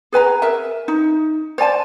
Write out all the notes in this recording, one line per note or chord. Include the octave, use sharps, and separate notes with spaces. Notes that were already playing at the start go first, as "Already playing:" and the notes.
G#4 B4 G#5 A#5
A#4 E5
D#4
C5 D5 G#5 A5